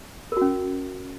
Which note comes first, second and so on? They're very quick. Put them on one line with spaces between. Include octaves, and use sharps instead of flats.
A#4 F#4 C#4